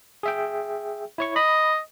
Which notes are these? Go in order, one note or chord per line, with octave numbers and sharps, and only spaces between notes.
G#4 E5 G5
E4 C#5 C#6
D#5 B5